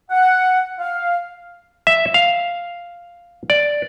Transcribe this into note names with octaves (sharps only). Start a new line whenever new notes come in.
F#5
F5
E5
F5
D5